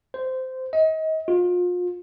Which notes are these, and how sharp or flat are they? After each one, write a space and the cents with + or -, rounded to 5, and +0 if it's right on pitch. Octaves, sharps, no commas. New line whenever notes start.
C5 -15
D#5 +30
F4 +35